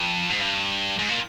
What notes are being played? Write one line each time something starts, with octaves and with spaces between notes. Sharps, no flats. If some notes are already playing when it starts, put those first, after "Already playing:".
Already playing: F2
G#2
G2
G#2
A#2